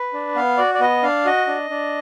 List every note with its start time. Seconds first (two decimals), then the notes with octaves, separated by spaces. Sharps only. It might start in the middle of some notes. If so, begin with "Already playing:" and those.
Already playing: B4
0.13 D4
0.35 B3 F5
0.58 F#4 D5
0.74 D5
0.80 B3 D#5
1.03 D4 F5
1.25 F#4 D#5
1.47 D4
1.70 D4